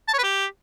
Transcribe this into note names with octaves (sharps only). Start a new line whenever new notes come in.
A5
C#5
B4
G4